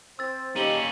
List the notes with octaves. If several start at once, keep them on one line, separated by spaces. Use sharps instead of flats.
C4 C5 E6 A6
D#3 A#3 C#4 D#4 G4 D#7 F#7 G7